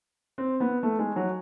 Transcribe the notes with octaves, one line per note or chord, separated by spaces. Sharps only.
C4
B3
A3
G#3
F#3